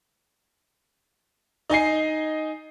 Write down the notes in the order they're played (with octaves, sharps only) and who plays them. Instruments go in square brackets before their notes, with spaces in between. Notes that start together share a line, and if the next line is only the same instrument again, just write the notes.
[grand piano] D#4 D#5 G#5 C7